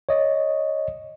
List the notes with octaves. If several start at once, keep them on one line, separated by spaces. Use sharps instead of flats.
C#5 D#5